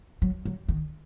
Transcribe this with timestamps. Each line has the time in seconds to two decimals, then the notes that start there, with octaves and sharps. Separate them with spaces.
0.22 F#3
0.45 F#3
0.68 D#3